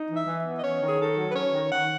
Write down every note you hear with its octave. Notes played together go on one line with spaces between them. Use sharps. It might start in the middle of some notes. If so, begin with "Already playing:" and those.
Already playing: D#4
E3
E5
E3
B3
D#5
C#4 C#5
D#3
G#4
D#3 A4
F#3
B4
C#4 C#5
D#3
D#3 F#5